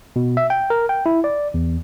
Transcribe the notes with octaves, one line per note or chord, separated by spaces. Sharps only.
B2
E5
G5
A#4
G5
E4
D5
E2